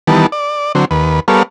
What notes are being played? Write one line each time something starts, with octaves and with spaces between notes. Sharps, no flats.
D#3 E3 G3 B3 A5
D5
D3 F#3 C4
D#2 B4
G3 B3 A4 A#4 C#5 F5